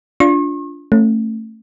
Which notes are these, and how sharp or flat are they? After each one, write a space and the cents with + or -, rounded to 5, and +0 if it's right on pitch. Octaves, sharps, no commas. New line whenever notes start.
D4 -20 F4 +0 C#6 -45
A3 +15 C#4 -20